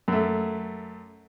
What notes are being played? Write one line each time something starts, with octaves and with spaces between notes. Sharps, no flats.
F#2 A3